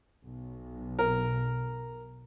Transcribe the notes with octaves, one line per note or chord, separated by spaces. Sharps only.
B1
A#4